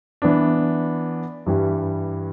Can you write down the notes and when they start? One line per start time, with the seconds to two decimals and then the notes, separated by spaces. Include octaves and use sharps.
0.22 E3 B3 D4
1.46 G2 E3 G3